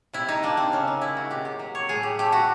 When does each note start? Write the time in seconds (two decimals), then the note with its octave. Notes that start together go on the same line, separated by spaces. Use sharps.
0.13 C3 E4
0.28 D#4
0.43 A#3 D4
0.57 C4
0.72 C#3 C#4
0.88 D#4
1.02 G#3 E4
1.17 F#4
1.31 C3 G4
1.45 G4
1.59 F#3
1.75 C#5
1.89 A2 G#4
2.03 G4
2.19 A3 G4
2.32 F#4